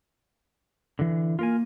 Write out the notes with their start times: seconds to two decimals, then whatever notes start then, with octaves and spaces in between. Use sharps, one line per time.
0.99 D3 E3
1.39 A#3 F4 A#4 G#5